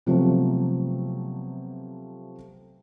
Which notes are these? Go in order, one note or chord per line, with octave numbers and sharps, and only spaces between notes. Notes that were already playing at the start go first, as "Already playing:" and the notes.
C3 F3 F#3 A3 B3